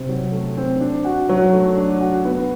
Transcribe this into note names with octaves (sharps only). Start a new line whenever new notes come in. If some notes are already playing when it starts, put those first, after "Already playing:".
Already playing: C3 C4
F#3
A3
C4
D4
F#4
F#3
A3
D4
F#4
B3